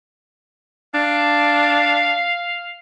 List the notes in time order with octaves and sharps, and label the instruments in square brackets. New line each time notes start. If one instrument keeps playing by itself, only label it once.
[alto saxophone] D4 [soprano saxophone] F5